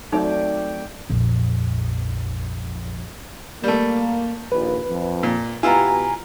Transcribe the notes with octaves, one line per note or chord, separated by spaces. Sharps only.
F#3 A3 C4 D#4 D5 G5
A#1 F2
G3 A3 A#3
A#1 D#2 A#2 B4
F2
A#2
B2 B3 E4 F4 G4 G#5 A#5